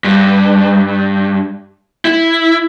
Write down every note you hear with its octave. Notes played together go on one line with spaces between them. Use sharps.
G2
E4